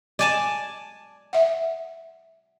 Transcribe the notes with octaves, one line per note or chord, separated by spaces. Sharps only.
D5 D#5 G#5 A5
E5 F#5